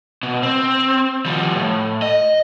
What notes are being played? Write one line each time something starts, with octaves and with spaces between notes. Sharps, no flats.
B2
C4
F3 G3
A2
D#5